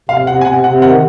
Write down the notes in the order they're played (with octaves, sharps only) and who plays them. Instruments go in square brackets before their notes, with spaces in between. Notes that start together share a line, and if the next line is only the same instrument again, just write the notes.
[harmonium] C3 [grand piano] F5
[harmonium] C3 [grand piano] F#5
[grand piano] G#5
[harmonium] C3 [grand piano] F#5
[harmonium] C3 [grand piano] F#5
[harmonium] D#3 [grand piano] F#5